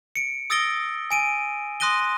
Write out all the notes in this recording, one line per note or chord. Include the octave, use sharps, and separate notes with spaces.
C#7 D7
D#6 E6 A6 A#6 D7 G7
G#5 D7 D#7
C6 D#6 F#6 A#6 D#7 G7